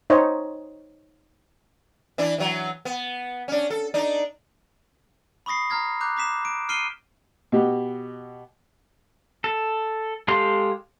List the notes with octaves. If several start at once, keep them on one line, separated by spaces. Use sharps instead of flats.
D#4 C5 C#5 D#5
E3 D4 E4
E3 F#3
B3
C#4 D4
A4
D4 D#4
B5 C#6 D#6 A#6 C7
A#5 F6 G#6 A#6
A#5 D6 F#6 G6
A#5 D6 B6 E7
D7
F6 C7 D7 D#7 G7
B2 F#4 G4
A4
G#3 G4 A4 F5 C6